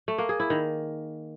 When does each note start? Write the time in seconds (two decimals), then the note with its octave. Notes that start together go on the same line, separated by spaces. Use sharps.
0.08 A3
0.18 A#3
0.29 G#4
0.40 E4
0.50 D#3